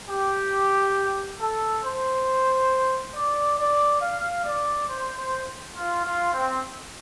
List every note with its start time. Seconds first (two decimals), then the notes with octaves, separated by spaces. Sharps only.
0.09 G4
1.40 A4
1.83 C5
3.15 D5
3.59 D5
4.01 F5
4.45 D5
4.89 C5
5.18 C5
5.76 F4
6.05 F4
6.34 C4